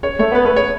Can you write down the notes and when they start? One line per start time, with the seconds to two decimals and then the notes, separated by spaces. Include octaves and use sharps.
0.03 C#5
0.19 A3 C#5
0.32 B3 B4
0.45 A3 B4
0.56 C#5